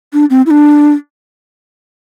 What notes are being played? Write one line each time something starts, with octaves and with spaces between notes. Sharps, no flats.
D4
C4
E4
D4